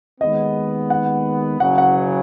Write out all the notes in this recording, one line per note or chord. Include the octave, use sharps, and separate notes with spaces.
D#2 D#3 G#3 B3 D#5
F#5
F#1 F#2 C#3 F#3 F#5
F#5